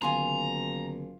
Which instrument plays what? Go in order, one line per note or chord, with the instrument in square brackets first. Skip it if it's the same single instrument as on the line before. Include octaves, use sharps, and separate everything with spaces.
[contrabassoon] F#1 [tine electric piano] D3 D#3 B3 [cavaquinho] F4 G#5 C6 [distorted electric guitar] A#5